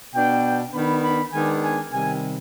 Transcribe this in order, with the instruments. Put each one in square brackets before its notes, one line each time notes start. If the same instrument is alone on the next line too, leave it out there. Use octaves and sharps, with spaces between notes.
[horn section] B2 B3 D4 G5
D#3 B3 D4 B5
B5
D#3 G#3 B3 D4 G#5
G#5
C3 D#3 G3 G#5